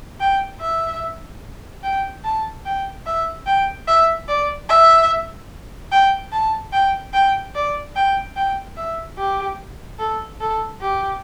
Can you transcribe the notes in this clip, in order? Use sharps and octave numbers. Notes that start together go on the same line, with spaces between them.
G5
E5
G5
A5
G5
E5
G5
E5
D5
E5
G5
A5
G5
G5
D5
G5
G5
E5
G4
A4
A4
G4